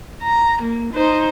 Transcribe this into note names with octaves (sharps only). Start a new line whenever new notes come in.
A#5
A#3
D#4 C5